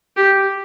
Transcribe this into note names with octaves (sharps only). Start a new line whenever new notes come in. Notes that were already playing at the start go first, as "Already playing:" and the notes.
G4